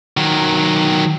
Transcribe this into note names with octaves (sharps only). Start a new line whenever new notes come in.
D#3 F#3